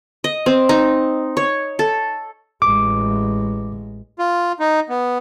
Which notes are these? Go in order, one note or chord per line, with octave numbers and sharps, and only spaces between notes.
D#5
C4
D#4
C#5
A4
A1 G#3 D6
F4
D#4
B3